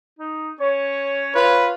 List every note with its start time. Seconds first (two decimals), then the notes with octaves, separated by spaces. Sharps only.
0.19 D#4
0.60 C#4 C#5
1.35 F4 B4